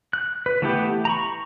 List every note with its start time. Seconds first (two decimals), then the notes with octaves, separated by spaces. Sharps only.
0.13 F#6
0.46 B4
0.62 E3 A3 B3 E4 G4
1.05 A#5 B5 C#6